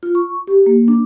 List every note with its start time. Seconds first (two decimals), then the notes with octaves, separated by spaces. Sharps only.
0.03 F4
0.15 C#6
0.47 G4
0.66 A#3
0.88 D4